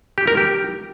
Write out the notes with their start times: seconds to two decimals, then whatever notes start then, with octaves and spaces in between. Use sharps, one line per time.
0.18 G4
0.27 A#4
0.37 G4